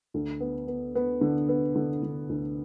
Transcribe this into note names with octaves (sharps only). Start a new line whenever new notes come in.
D2
B3
B3
B3
D3
B3
D3
D3
D2